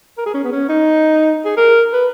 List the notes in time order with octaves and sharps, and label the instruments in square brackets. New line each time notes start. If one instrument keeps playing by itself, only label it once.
[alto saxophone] A#4
G#4
C#4
B3
C#4
D#4
G#4
A#4
B4